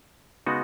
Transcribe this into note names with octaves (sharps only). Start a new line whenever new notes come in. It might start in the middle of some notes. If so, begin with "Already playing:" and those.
C#3 G#3 B3 D#4 F#4